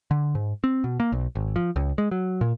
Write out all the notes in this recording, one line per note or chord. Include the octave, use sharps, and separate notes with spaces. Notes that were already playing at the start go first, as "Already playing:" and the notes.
D3
G#2
C4
B2
A#3
B1
G#1
F3
C#2
G#3
F#3
A#2